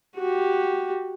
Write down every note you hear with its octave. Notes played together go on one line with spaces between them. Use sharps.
F#4 G4